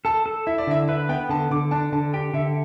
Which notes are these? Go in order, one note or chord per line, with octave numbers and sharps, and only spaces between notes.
A4 A5
A4
E4 E5
D5
D3 E5
B4 E5
B3 G5
D3 A5
D3 D6
D4 A5
D3 A5
G4 G5
D3 E5